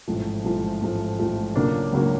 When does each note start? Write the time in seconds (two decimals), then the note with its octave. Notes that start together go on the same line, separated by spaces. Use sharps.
0.08 A1 G#2 F3 A3
0.44 A1 G#2 F3 A3
0.81 A1 G#2 F3 A3
1.19 A1 G#2 F3 A3
1.55 C#2 C#3 F#3 A#3 D4
1.93 C#2 C#3 F#3 A#3 D4